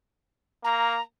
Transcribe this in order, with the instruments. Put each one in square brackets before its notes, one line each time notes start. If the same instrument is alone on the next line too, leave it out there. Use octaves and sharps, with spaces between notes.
[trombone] A#3 [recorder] A#5